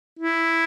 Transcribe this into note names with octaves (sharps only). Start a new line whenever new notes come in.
E4